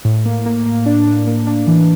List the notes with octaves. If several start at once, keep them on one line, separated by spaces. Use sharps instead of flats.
A2
A#3
A#3
A#3
D4
D4
A#3
D4
E3